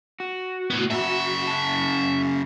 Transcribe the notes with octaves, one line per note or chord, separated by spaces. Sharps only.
F#4
A2 B3
F#2 C#3 E5
C#4 A5